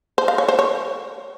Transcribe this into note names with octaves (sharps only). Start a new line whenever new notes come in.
C5
F5
C#5
C5
C#5